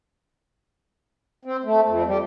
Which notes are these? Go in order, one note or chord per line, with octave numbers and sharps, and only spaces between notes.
C4
A3
F2
G3